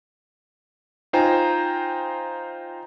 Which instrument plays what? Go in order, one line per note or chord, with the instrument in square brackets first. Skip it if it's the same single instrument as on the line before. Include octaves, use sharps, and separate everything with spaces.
[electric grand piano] D#4 F4 C5 G5 G#5 A#5